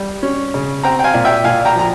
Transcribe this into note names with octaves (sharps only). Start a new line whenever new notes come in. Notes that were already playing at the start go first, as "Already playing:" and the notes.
Already playing: G3
C#4
C#3
C4 G5 A#5
G5
F5 G#5
A#2
E5 G5
A#2 F5 G#5
G5 A#5
F3 A#5